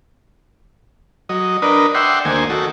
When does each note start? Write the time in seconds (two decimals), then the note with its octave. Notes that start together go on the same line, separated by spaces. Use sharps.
1.29 F#3 D#5
1.62 D4 A#4 B4 D#5
1.95 D5 E5 F#5 G5 C6
2.25 D2 D#3 A#3 C5 G#5
2.50 D#3 F#4 A4